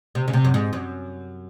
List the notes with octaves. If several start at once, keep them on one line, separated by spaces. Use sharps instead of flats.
C3
C#3
C3
F#2
G#2
F#2